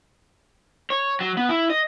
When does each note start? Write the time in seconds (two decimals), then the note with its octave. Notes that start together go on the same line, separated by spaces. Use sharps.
0.90 C#5
1.20 F#3
1.37 B3
1.49 E4
1.70 D#5